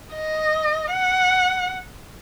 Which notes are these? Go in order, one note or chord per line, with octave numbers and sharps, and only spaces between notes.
D#5
F#5